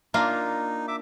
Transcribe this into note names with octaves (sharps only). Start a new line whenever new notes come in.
A#3 D4 D#4 F4
E5 D6